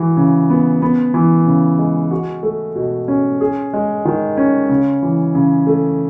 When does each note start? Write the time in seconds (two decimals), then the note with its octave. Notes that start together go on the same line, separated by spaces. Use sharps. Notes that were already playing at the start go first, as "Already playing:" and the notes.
Already playing: E3 F#4
0.17 C#3
0.50 B3
0.82 B3
1.14 E3
1.46 C#3
1.79 G#3
2.11 F#4
2.43 A3
2.75 B2
3.08 C#4
3.41 G#4
3.73 G#3
4.05 D#3
4.37 C#4
4.69 C#3
5.03 E3
5.35 C#3
5.67 A3